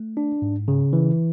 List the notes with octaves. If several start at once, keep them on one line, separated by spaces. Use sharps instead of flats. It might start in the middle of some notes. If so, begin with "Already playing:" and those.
Already playing: A3
D4
G#2
C#3
E3